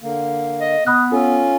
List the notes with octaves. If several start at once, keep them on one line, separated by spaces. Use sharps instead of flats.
D3 A#3
D#5
B3 B5 D#6 F#6
C#4 F4 A4 E6